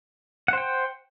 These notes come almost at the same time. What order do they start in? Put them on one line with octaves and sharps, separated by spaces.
F#5 C5 G5